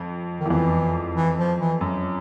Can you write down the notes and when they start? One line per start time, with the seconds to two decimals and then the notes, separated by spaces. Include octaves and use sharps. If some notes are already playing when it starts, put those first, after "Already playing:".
Already playing: F2
0.40 D#3
0.46 E2
0.49 F2 E3
1.15 E3
1.38 F3
1.59 E3
1.81 F#2